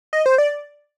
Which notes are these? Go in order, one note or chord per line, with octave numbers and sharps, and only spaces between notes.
D#5
C5
D5